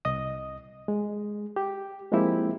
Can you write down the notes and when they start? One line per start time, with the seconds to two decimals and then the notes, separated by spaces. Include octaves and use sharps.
0.05 C2 D#5 D#6
0.88 G#3
1.56 G4
2.12 F3 G#3 A#3 C4 E4 G4